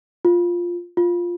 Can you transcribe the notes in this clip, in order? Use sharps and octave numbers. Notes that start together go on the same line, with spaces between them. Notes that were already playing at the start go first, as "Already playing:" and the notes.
F4
F4